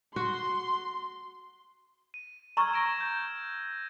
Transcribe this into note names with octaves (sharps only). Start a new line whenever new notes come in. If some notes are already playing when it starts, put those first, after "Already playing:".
F#4 C6
D#7
A#5 C#6 E6 F6 G#6
A#6 D7 E7
G6